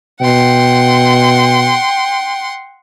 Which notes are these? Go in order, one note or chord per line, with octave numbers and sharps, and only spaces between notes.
B2 F#5 G5 C6